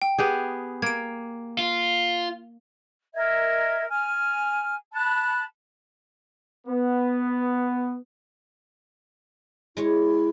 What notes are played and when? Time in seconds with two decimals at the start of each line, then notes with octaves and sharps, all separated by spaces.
0.02 G5
0.18 B3 G4 G#4
0.82 A#3 G#6 D7
1.59 F4
3.14 A#4 D#5 E5 G#6
3.89 G#5 F6
4.93 A5 B5 F#6
6.67 B3
9.77 G#3 E4 C#5